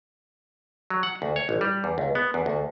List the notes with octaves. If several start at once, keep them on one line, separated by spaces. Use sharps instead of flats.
F#3
F#5
D2
C#5
A1
G3
E2
C#2
B3
E2
D2